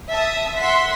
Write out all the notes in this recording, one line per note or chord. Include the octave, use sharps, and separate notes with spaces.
E5 A5 D#6
E5 F#5 C6 B6